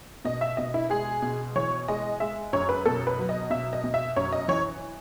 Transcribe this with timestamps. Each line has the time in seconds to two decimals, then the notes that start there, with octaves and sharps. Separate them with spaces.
0.25 B2 D#5
0.41 E5
0.57 B2 D#5
0.74 E4
0.90 G#3 G#4
1.22 B2
1.56 E3 C#5
1.88 G#3 D#5
2.20 G#3 E5
2.53 F#2 C#5
2.69 B4
2.86 B2 A4
3.07 B4
3.19 F#3
3.29 D#5
3.50 B2 E5
3.73 D#5
3.84 B2
3.94 E5
4.16 F#2 C#5
4.32 D#5
4.48 E3 C#5